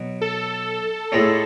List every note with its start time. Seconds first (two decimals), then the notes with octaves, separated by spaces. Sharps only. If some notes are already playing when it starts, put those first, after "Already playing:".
Already playing: B2 F#3
0.21 A4
1.12 A2 G#3 C#4